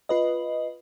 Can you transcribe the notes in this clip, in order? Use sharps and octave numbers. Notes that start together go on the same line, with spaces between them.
F4 B4 D#5